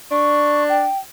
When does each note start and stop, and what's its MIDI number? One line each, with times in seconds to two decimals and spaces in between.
0.11 0.86 62
0.11 0.63 85
0.69 0.98 79